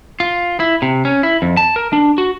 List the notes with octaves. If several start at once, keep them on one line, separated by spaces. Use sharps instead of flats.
F4
E4
C3
C#4
E4
F2
A5
A#4
D4
F#4